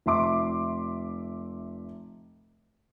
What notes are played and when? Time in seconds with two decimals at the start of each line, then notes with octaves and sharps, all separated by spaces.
0.06 F1 E5 C6 D6